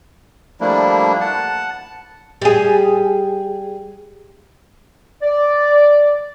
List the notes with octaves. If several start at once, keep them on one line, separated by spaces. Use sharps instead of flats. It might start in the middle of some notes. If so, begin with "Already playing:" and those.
F3 G3 A3 A#3 D4 E4
F#5 A5
G3 G#4
D5